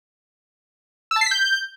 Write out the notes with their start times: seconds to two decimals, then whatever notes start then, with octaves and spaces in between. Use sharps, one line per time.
1.11 E6
1.16 A5
1.21 C7
1.26 B6
1.31 G6